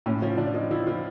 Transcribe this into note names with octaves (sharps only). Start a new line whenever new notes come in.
A2 C#4
F3 C#4
F3 D4
F3 D#4
F3 E4
F3 F4